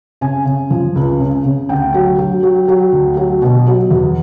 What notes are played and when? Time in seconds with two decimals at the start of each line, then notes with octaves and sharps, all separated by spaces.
0.21 C#3 G#5
0.45 C#3
0.70 F3
0.95 C#2
1.20 C#3
1.45 C#3
1.69 D2 G5
1.94 F#3
2.18 F#3
2.43 F#3
2.68 F#3
2.92 D2
3.17 F#3
3.42 B2
3.67 F#3
3.91 E2